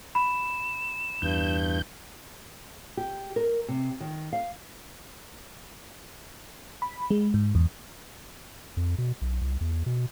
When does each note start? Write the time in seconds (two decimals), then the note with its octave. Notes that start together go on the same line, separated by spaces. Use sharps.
0.15 B5 E7
1.22 E2 G2 G6
2.97 G4
3.36 A#4
3.68 C3
4.00 D#3
4.33 F5
6.82 B5
7.11 G#3
7.34 G#2
7.55 E2
8.77 F2
8.98 B2
9.22 B1
9.41 C2
9.61 E2
9.86 B2